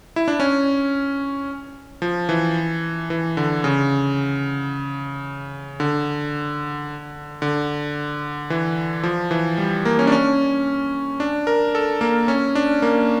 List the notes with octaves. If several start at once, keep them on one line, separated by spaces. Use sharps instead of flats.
E4
D4
C#4
F3
E3
E3
D3
C#3
D3
D3
E3
F3
E3
G3
A#3
C#4
D4
C#4
D4
A#4
A4
A#3
C#4
D4
A#3